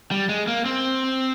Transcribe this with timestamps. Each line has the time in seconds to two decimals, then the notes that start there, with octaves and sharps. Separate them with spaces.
0.11 G3
0.29 G#3
0.47 A#3
0.65 C4